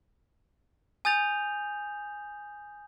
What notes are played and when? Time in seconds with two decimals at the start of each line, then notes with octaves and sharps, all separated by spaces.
1.05 G#5 D#6 G6 A6 F7